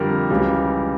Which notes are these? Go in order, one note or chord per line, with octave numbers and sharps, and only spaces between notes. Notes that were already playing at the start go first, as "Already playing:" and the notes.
Already playing: F2 D3 G3 A#4
C#2 C#3 E3 G3